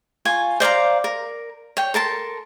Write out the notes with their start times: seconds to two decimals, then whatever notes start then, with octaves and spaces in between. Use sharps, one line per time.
0.25 F4 G#5 C#6
0.60 C5 D5 F5 A#5
1.04 A#4
1.77 C#5 G5
1.94 A4 A#4 A5 C6